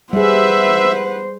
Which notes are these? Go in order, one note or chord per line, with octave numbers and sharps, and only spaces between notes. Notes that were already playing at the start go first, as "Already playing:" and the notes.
G3 G#4 B4 C5 E5 F#5